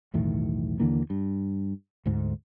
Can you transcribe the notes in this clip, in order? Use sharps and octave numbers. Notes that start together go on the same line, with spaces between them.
B1 E2 A2 D#3
D#2 D3 E3 A#3
G2
D2 G#2